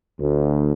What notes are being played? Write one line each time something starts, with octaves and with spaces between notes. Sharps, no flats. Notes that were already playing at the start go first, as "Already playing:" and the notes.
D2